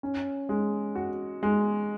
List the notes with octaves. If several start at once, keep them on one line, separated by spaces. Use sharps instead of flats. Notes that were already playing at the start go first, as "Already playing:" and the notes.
C#4
G#3
F#4
G#3